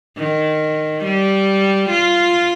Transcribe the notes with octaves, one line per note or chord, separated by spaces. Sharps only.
D#3
G3
F4